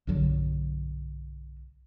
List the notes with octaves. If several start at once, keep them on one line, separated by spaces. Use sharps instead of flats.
B1 G2 D3 F#3